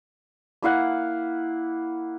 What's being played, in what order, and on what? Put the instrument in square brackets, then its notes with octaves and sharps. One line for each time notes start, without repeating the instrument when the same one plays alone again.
[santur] A#3 E4 F5 F#5